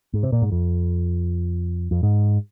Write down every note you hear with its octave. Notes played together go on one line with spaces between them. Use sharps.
G#2
C3
A#2
G#2
F2
F2
G#2